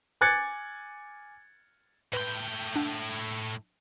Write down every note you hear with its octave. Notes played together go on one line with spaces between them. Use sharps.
G#5 D6 F#6 G#6 A6 C#7
A2 B4 G5 B5 C6
D4 F#5